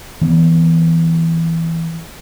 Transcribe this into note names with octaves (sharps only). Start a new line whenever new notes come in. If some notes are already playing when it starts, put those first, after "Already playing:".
E3 B3 C4